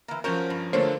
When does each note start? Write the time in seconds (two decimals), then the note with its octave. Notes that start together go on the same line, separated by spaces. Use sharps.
0.08 E3 A#3
0.24 F3 C#4 F#4 A#4 C5 C#5
0.50 G2
0.73 D3 F3 F#3 A3 A#3 D4 C5 C#5